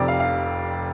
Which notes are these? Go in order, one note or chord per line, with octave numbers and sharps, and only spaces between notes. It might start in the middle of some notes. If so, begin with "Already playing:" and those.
Already playing: F1 F2 C3 D5
F5
F5